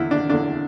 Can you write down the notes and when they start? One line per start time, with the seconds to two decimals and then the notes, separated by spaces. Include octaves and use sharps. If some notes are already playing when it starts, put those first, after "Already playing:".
Already playing: E2 D3 E4
0.11 D4
0.29 E2 D3 D4